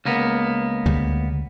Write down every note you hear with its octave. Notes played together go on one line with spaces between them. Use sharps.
C#2 A#3 B3
D2 C#3 G3